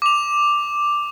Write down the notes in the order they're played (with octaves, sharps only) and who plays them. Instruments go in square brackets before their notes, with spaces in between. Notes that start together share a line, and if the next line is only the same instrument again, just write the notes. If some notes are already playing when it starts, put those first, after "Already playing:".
[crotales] D6 F7